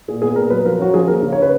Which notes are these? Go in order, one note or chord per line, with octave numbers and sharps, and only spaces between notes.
A#2 G#4
B3 G#4
A#2 A#4
F#3 B4
F3 A#4
C#4 F#4
F3 G#4
A#3 A#4
C#3
C#5
C#4 B4